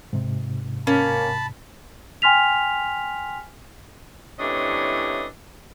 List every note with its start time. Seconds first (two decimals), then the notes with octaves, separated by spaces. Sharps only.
0.13 G#2 C3
0.87 A#3 C#4 A5 B5
2.22 G5 G#5 C6 F6 B6 F7
4.39 A2 C3 E3 C#4 D4 D#5